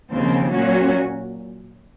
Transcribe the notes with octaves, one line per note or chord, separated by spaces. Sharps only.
D#2 C#3 F3 C4
A#2 F#3 C#4 F#4